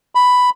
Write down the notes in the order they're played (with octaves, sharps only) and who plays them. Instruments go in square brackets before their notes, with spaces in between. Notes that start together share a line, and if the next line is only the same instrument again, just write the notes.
[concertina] B5